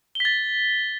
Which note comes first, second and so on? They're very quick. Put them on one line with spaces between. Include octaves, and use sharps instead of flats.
G7 B6 A6